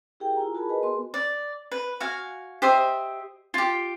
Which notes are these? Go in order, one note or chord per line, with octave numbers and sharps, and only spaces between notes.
E4 G4 G#4 A#4 G5
E4 F4 G#5 A#5
F#4 G#4 A#4 A5 B5
G#4 A#4 B4 D#5 G#5
B3 F#4 C6
D5
B4
F#4 F5 G#5
G4 C5 D#5 E5
F4 G4